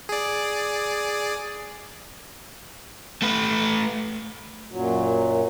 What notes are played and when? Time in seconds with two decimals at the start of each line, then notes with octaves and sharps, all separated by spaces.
0.09 G#4 D5
3.22 A3 B4
4.70 F#2 A#2 F#3